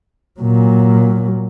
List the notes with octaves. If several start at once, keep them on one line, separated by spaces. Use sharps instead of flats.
A#2 F#3